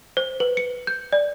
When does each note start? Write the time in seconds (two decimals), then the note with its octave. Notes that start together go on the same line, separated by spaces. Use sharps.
0.17 C5
0.40 B4
0.57 C#7
0.87 G6
1.12 D5